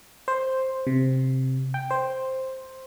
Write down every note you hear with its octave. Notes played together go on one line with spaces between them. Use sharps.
C5
C3
G5
C5